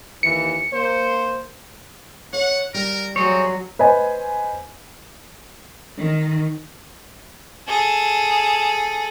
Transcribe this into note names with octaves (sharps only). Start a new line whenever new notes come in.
D#2 E3 C#7
A#3 C5
C#5 F#5
G3 A#4
F#3 C4 G#4 C5 C#5
B4 C5 D#5 G#5
D#3
G#4 A4